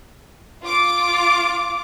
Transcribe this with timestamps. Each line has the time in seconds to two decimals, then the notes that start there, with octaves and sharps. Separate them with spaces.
0.63 F4 D6